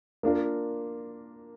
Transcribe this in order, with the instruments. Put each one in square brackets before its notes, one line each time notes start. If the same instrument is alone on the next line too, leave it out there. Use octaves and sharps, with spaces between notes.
[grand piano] A#3 D4 F4 A#4